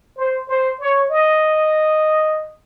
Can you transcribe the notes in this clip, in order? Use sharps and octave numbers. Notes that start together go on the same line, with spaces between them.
C5
C5
C#5
D#5